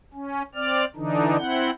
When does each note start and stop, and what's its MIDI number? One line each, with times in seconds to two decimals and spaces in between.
0.14 0.42 61
0.55 0.85 60
0.55 0.85 74
0.55 0.85 89
0.96 1.37 50
0.96 1.37 52
0.96 1.37 62
0.96 1.37 63
1.38 1.71 60
1.38 1.71 64
1.38 1.71 78
1.38 1.71 91